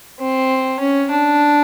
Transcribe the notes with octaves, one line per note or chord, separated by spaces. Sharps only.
C4
C#4
D4